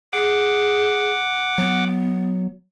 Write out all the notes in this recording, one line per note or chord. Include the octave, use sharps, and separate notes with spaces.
G#4 F#5 D6
F#3 B3